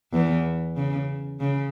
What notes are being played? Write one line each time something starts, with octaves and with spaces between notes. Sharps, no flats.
E2 E3
C#3
C#3